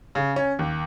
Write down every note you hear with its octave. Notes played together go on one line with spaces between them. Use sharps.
C#3
C#4
D#2